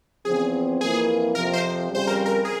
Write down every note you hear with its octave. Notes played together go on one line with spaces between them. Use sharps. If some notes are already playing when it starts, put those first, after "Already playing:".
E2 C#3 F3 C4 G#4
F2 E3 A#3 F4 G#4
F2 C3 F3 A#4
C5
F2 C#3 G3 C5
A#4
A#4
G#4